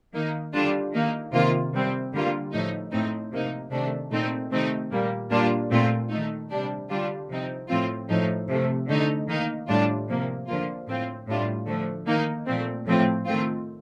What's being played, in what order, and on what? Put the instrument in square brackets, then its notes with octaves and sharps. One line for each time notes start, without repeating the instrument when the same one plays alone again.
[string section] D#3 A#3 D#4
D3 G3 D4 F4
D#3 A#3 D#4
C3 D#3 A#3 F4
C3 G3 C4
D3 G3 A#3 F4
A2 F3 A3 D#4
A2 A3 C4 D#4
C3 F3 A#3 D#4
C3 D#3 A3 D4
A#2 A3 C4 D#4
C3 D#3 A3 C4 D#4
A#2 G3 A#3
A#2 G3 A#3 D4 F4
A#2 A3 C4 F4
D#3 A3 D#4
C3 G3 D4
D3 G3 D4 F4
C3 F3 C4 D#4
A2 F3 C4 F4
A2 F3 A3 D#4
C3 F3 A3
D3 A3 D#4
D#3 A#3 D#4
A2 G3 D4 F4
C3 F3 A#3
D3 F3 A#3 F4
A2 F3 C4 F4
A2 G3 D4 F4
D3 F3 A3
D#3 A#3 D#4
A#2 F3 A3 C4
A2 F3 A3 C4 F4
D#3 A3 C4 F4